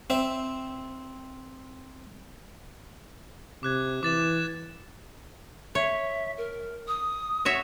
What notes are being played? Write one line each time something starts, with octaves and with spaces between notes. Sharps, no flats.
C4 E5
C3 D6 F#6 G#6
E3 D6 A6 E7
C#5 E5
A#4
D#6
F#4 C#5 E5